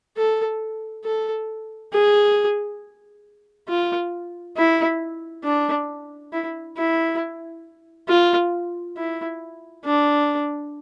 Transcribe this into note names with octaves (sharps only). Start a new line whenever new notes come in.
A4
A4
G#4
F4
E4
D4
E4
E4
F4
E4
D4